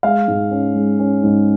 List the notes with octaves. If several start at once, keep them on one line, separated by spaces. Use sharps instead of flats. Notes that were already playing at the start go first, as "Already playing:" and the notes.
G#3 F5
G#2
C#4
G#3
C#4
G#2